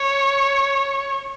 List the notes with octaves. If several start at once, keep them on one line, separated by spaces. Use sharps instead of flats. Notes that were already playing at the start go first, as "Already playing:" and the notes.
Already playing: C#5